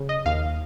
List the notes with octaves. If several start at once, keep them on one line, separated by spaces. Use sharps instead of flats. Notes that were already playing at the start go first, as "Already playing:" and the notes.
Already playing: C#3
D#5
D#2 F5